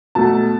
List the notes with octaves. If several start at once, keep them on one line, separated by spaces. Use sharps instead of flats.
B2 A3 A5